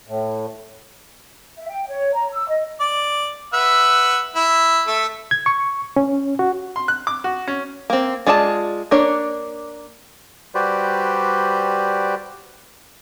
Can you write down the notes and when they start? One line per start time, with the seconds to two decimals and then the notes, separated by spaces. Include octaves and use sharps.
0.07 A2
1.56 E5
1.70 G5
1.88 C#5
2.14 A#5
2.31 E6
2.48 D#5
2.80 D5
3.53 B4 E5 F#5
4.36 E4
4.87 A3 E5
5.31 G#6
5.46 C#6
5.96 C#4
6.39 F#4
6.76 C6
6.88 F#6
7.07 D6
7.24 F#4
7.47 C#4
7.90 A#3 C4
8.26 G#3 F4 G#4 D5 A5
8.91 A#3 D4 C#5
10.55 G3 F#4 G4 B4 C5 D5